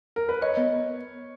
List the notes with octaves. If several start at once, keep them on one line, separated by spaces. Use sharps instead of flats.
A#4
B4
C#5 D#5
B3